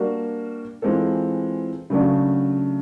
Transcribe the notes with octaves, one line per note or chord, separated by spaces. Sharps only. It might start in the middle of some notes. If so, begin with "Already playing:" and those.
Already playing: G3 A#3 D4 F#4
E3 G#3 C4 F4 A4
C#3 F#3 A3 D4 F#4